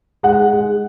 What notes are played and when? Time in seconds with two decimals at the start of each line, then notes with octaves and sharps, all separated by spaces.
0.23 G#3 F#5
0.53 G#3